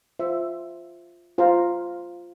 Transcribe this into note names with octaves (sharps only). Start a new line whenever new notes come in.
F4 C5 E5
F4 C5 F5 A#5